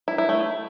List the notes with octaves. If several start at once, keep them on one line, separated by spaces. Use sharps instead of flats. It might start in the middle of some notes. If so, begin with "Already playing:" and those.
E4
E4
A3